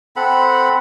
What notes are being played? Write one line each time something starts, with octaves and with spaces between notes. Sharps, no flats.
C4 A4 F#5 B5